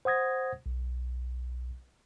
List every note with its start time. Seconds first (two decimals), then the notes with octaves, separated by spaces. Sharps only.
0.05 C5 F#5 D#6 G#6 A#6
0.66 B1